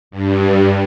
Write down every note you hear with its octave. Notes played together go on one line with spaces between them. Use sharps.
G2